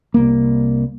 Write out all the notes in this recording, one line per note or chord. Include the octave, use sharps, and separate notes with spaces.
C2 A#3